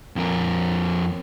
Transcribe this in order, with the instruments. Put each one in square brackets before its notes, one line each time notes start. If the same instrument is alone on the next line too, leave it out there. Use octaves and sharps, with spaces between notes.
[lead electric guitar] F2 A#4